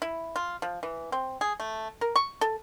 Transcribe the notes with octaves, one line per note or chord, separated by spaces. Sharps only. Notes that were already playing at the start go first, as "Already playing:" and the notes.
E4
F4
F3
E3
C4
G#4
A3
A#4
C#6
A4